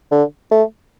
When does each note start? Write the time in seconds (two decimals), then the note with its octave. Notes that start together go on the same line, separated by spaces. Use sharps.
0.12 D3
0.51 A3